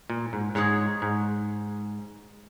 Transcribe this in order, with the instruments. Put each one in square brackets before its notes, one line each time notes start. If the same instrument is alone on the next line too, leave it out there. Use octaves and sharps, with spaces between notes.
[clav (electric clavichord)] A#2
G#2
[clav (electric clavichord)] G#2 [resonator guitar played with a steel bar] G#3 D#4 G#4 C#5
[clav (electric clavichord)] G#2